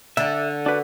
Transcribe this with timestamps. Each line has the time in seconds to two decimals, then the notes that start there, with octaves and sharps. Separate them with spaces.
0.17 D3 D5 E5
0.66 D4 F#4 B4